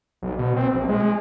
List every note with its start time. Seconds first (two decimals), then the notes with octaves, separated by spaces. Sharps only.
0.22 B1
0.38 B2
0.56 C4
0.74 A#1
0.88 G#3
1.02 G#3